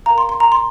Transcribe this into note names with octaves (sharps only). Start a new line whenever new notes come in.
A#4 F5 A#5
C6
C6
A#5
C6